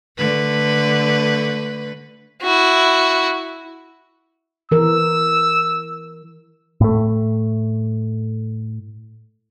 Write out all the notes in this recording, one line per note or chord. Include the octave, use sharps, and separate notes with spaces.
D3 A3 B4
E4 F#4
E3 A#4 E6
A2 A3